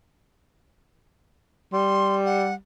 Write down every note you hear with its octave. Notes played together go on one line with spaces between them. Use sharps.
G3 C6
F#5